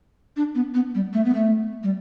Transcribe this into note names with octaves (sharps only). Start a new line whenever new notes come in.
D4
B3
B3
G3
A3
B3
A3
G3